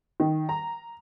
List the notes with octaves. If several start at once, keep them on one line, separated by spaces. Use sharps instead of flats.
D#3
A#5